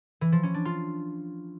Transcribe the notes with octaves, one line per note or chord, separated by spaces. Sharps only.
E3
F3
C#4
D4
F4